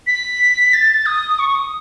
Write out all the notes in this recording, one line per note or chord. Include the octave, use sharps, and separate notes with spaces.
B6
A6
D#6
C#6
D#6